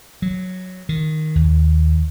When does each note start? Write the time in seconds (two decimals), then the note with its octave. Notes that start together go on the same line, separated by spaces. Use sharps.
0.22 F#3
0.89 D#3
1.35 D#2